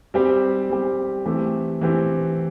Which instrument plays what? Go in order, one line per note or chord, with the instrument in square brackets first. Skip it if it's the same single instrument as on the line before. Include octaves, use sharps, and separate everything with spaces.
[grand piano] G3 C4 G4
G3 C4 G4
E3 A3 C4 G4
E3 A3 C4 G4